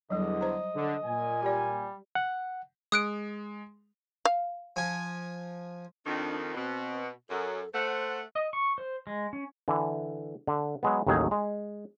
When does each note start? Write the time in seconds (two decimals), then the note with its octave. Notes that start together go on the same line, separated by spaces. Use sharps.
0.10 E2 D3 F#3 G3 D#5
0.41 C5 A#5
0.75 D3
1.05 A#2 G#5
1.43 G3 G4 D5
2.15 F#5
2.92 G#3 D#6 F#6 D7
4.25 F5
4.76 F3 G#5
6.05 F2 D#3 D4
6.54 B2 C4
7.30 F#2 A4
7.73 A3 C5 F#5
8.35 D#5
8.53 C#6
8.78 C5
9.07 G#3
9.33 C#4
9.68 D3 E3
10.47 D3
10.83 F#3 G#3 B3
11.07 A1 D#2 D#3 F#3 D#4 G#4
11.31 G#3